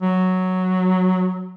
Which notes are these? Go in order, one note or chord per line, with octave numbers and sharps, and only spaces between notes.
F#3